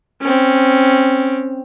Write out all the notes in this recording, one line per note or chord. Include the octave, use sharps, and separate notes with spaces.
C4 C#4